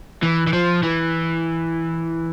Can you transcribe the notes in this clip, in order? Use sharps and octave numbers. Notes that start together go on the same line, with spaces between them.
E3
E3
F3
E3